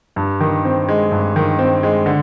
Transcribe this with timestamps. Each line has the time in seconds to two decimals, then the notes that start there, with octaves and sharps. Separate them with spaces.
0.16 G2
0.40 D#3
0.65 C4
0.88 G#3
1.12 G2
1.36 D#3
1.59 C4
1.83 G#3
2.06 D3